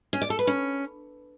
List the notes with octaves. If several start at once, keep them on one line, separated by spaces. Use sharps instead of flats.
C#4
D5
A4
B4
C#4